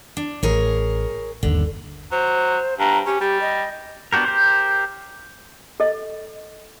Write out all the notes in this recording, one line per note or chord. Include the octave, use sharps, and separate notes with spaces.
D4
A1 G#4 A#4 C#5
G1 D#2 D3
F#3 C5
G2 A#5
C#4 G4
G3 G4
D#5
B3 D4 F#4 G4 A#4
G4 A#4 C5
A4 D#5